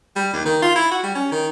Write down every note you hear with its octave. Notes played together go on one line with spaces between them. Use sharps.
G3
D#2
D#3
F4
E4
F#4
G3
C#4
D#3